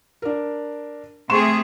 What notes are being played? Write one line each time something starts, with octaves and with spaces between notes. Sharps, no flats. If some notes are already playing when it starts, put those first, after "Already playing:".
D4 A#4
C3 A3 G#4 C6 C#6 E7